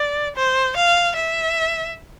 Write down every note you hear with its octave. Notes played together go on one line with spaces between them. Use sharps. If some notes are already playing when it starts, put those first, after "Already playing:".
Already playing: D5
C5
F5
E5